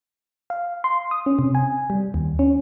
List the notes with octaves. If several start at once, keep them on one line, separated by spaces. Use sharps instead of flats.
F5
C6
D#6
C#4
C3
G#5
G3
D#2
C#4